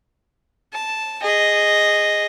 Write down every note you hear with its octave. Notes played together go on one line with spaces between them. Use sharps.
A5
G#4 D#5